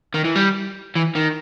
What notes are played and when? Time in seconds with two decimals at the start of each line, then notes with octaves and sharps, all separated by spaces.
0.15 D#3
0.25 E3
0.36 G3
0.95 E3
1.15 D#3